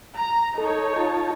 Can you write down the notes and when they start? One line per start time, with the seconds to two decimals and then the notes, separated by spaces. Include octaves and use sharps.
0.15 A#5
0.58 D#4 A4 C#5
0.96 F4 A5